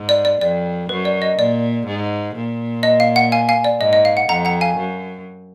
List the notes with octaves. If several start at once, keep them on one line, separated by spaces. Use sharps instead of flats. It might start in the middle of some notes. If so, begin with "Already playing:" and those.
Already playing: G#2
D5
D5
F2 D5
F#2 B4
D5
D#5
A#2 D5
G#2
A#2
D#5
F5
F#5
F5 G#5
F5 G#5
D5
G#2 D#5
D#5
F5
F#5
F2 F#5 A#5
F#5 A#5
F5 G#5
F#2